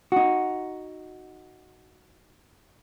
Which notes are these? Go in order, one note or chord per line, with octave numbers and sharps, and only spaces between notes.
D#4 F#4